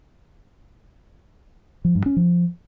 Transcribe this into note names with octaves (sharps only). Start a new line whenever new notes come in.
F3
G2
C#4
F3